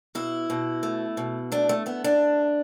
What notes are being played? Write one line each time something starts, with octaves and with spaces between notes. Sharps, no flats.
B2 E4
B2
A3
B2
A3 D4
A3
A3 B3
D4